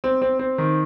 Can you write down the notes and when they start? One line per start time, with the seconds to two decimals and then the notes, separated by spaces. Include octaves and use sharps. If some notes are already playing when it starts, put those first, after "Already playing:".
0.04 C4
0.22 C4
0.39 C4
0.58 D#3